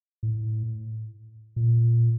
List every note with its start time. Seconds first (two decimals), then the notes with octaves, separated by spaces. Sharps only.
0.23 A2
1.56 A#2